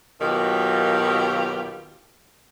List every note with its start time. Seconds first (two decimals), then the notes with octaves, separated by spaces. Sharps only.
0.21 D#2 B2 D#3 F#3 F4 G4